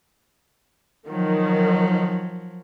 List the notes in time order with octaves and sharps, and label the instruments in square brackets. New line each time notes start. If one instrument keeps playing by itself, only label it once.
[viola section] D#3 [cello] F3 F#3